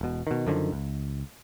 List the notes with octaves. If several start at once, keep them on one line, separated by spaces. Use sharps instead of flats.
E1 B2
B2 D#3
F#2 D3 D#3 F3
C#2